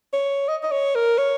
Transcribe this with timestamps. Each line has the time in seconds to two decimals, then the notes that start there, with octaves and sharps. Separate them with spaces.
0.13 C#5
0.48 D#5
0.63 D#5
0.72 C#5
0.95 A#4
1.18 C#5